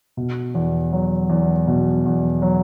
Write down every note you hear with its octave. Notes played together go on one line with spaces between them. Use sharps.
B2
E2
F#3
E2
B2
E2
F#3